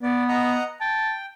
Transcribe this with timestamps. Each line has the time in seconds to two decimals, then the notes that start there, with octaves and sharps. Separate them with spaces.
0.03 B3 D5
0.29 D#5 F#5 A#5
0.81 G5 A5